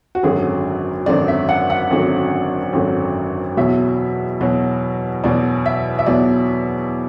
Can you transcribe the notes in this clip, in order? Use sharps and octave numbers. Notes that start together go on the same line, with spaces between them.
F#4
G#1 F#2 D3 F#3 G#4
G#1 F#2 D3 F#3 D5
E5
F#5
F#5
G#1 F#2 D3 F#3
G#1 F#2 D3 F#3
E2 B2 F#3 E5
E2 B2 F#3
E2 B2 F#3 D5
E5
E5
E2 B2 F#3 D5